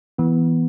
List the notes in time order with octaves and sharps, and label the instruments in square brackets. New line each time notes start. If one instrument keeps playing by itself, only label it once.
[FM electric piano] E3 [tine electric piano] B3